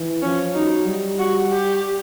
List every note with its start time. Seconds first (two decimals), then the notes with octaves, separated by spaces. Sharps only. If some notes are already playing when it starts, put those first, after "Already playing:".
Already playing: E3
0.22 F3 C#4
0.55 F#3 D#4
0.86 G3
1.19 F#4
1.51 G4